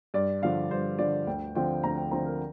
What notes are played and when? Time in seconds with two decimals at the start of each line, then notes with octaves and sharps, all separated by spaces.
0.14 G2 D5
0.42 D3 F3 F5
0.71 G2 C5
0.99 D3 F3 D5
1.27 D2 G5
1.55 D3 F3 C4 G5
1.84 D2 A#5
1.97 G5
2.11 D3 F3 C4 A#5
2.26 A#4